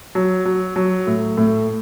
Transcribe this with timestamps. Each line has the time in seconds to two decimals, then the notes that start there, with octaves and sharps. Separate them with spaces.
0.15 F#3
0.45 F#3
0.76 F#3
1.07 A2
1.37 A2